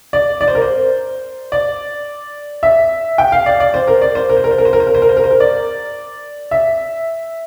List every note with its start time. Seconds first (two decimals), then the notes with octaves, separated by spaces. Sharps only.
0.13 D5
0.41 D5
0.48 C5
0.55 A#4
0.62 C5
1.52 D5
2.63 E5
3.18 G5
3.32 F5
3.46 D5
3.60 D5
3.74 C5
3.88 A#4
4.02 D5
4.15 C5
4.29 A#4
4.37 C5
4.44 A#4
4.51 C5
4.58 A#4
4.65 C5
4.73 A#4
4.80 C5
4.87 A#4
4.95 C5
5.02 A#4
5.09 C5
5.17 A#4
5.24 C5
5.31 A#4
5.40 D5
6.51 E5